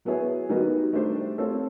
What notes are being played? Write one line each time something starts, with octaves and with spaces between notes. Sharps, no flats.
F#3 B3 E4 G#4 C#5
D#3 G3 B3 D#4 F#4
A3 D4 G4 C5
A3 C4 F4 A4 C#5